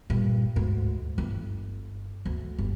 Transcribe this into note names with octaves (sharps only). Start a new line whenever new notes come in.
G2 A#2
D2 G#2
G1
D2
G1